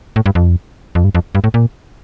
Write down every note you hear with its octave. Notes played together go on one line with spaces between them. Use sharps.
A2
G2
F2
F2
G2
F2
G2
A2
A#2